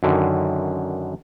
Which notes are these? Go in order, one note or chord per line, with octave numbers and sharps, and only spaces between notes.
F#2 D3 D#3